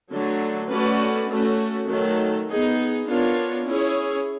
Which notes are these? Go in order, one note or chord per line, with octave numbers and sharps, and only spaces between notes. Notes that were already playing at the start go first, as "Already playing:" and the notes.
D3 F#3 A3
A3 C#4 F#4 B4 D5
A3 C#4 F#4
D#3 F#3 A3
B3 D#4 G#4
B3 D4 F4 A#4 C#5
C#4 E4 G#4 C#5